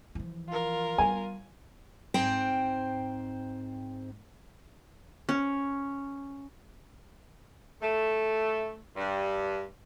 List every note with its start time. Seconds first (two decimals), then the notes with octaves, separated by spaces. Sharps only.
0.15 E3 F3
0.49 F4 A#4
0.98 G3 B3 G#5
2.14 G#2 C4 C5 G5
5.29 C#4
7.82 A3
8.96 G2